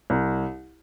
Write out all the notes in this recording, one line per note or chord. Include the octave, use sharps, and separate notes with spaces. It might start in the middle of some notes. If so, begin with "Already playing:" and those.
C2